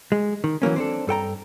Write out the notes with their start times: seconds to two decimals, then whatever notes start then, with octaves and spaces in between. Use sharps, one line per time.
0.12 G#3
0.44 D#3
0.62 E3 F#3 A#3 C#4
0.76 C4 D4 A4
1.07 G2 A4 G5 A#5